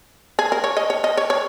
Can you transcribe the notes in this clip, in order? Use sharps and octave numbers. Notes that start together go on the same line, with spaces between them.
G#4
A#4
C#5
D#5
C#5
D#5
C#5
C#5